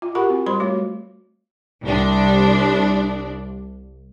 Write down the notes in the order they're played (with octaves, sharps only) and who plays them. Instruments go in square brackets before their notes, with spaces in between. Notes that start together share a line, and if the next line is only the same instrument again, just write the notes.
[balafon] F4
F#4 G4 A#4 F#5 B5 C#6
C4
G3 C5 B5 C6
A3 F#4 C#5
[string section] C2 D4